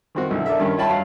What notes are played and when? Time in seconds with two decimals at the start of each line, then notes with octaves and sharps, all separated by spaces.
0.15 D#3 C4 F#4
0.31 B1 D3 E4
0.46 D4 A4 A#4 E5
0.59 G2 D#3 C#4
0.77 F4 C#5 E5 G5 A5 B5
0.89 G2 F#3 F5